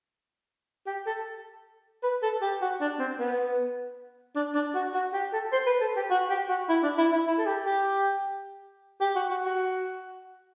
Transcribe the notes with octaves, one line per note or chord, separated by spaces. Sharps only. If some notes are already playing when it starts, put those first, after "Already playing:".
G4
A4
B4
A4
G4
F#4
D4
C4
B3
D4
D4
F#4
F#4
G4
A4
C5
B4
A4
G4
F#4
G4
F#4
E4
D4
E4
E4
E4
A4
G4
G4
G4
F#4
F#4
F#4